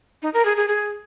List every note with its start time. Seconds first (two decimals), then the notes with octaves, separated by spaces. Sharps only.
0.22 D#4
0.34 A#4
0.45 G#4
0.57 G#4
0.68 G#4